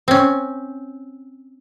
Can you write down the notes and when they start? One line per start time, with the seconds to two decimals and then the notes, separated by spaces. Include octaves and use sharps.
0.08 C4 C#4